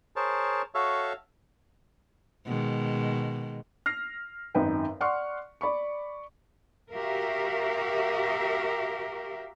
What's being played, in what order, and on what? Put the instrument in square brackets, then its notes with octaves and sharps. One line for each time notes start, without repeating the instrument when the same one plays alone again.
[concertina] G#4 A#4 C5 C#5 A5
F#4 A4 C#5 E5 F5
[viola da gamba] B2 D#3 G#3
[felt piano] F6 A#6 C7
G#1 F#2 D#4 B4 G5
D5 F#5 C6 C#6 F6
D5 B5 C#6
[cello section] F#4 G4 A#4 E5 F5